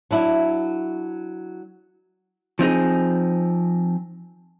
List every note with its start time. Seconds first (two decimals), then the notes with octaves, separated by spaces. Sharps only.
0.11 F#3 D4 E4
2.59 F3 C4 D#4 G#4